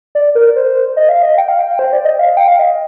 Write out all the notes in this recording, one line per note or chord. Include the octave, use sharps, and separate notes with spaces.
D5
A#4
C5
D#5
F5
D#5
G5
F5
G5
C5
D5
D#5
F5
G5
F5
D#5